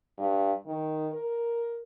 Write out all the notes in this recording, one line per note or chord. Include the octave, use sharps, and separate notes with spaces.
G2
D#3
A#4